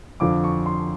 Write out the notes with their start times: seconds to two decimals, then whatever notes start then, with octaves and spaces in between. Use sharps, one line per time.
0.20 F2 D3 F3 D6
0.44 C#6
0.66 C6